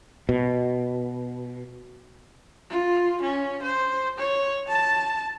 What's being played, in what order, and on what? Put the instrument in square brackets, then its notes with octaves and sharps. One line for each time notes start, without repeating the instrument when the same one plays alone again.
[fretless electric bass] B2
[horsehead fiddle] F4
C#4
C5
C#5
A5